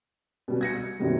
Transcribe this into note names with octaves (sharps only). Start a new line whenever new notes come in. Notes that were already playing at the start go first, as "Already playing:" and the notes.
B2 G3
G#6 A#6 C#7
F#2 B2 D#3 F#3 G3